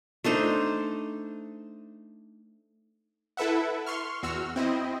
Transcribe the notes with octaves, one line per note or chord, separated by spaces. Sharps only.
A3 D4 D#4 C5
E4 A4 B4 E5 F#5
C6 C#6 F6
E2 F#4 E6 F6
C4 E4 D#5